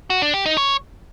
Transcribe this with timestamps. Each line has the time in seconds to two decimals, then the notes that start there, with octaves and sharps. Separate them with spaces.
0.10 F#4
0.22 D4
0.34 G4
0.46 D#4
0.57 C#5